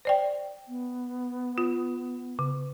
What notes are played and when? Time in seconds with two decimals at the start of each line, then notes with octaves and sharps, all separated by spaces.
0.05 C5 D5 G5
0.68 B3
1.58 F4
2.39 C#3